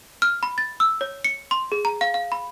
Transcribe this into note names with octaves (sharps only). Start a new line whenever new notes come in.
F6
B5
A6
E6
C#5
C#7
C6
G#4
A#5
F5
F5
B5